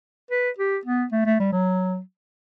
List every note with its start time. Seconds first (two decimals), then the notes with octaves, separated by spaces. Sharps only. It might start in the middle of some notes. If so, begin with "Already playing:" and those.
0.31 B4
0.58 G4
0.86 B3
1.12 A3
1.26 A3
1.40 G3
1.52 F#3